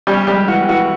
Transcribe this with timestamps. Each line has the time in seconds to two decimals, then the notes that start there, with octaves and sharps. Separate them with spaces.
0.07 G3 C#4 G4
0.27 G3 G#3 G4
0.48 E3 F#4
0.69 E3 F#4